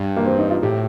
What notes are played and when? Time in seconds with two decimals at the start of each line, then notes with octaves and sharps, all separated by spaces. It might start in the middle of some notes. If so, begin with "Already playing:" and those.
Already playing: G2
0.17 A#3
0.26 C4
0.39 D#4
0.51 F4
0.63 A2 G4